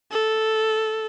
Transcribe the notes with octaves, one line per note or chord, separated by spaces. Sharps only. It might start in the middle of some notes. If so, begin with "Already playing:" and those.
A4